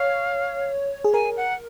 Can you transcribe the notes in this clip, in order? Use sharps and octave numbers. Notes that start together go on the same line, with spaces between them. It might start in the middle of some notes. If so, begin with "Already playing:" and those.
Already playing: C#5 F5
G#4
A#4 G#5
F#5